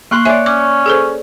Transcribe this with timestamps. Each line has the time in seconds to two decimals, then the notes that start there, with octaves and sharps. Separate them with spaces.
0.11 A#3 C6 C#6 F#6
0.25 C#5 D5 E5 G#5
0.46 C#4 C#6 D6
0.86 G#4 A4 C5